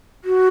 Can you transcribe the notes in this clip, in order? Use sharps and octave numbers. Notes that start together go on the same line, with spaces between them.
F#4